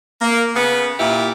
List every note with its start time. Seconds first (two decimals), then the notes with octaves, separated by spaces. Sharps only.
0.21 A#3
0.55 C#3 B3
0.99 A#2 E4 G4